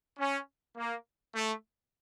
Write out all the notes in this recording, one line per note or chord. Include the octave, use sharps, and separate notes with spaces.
C#4
A#3
A3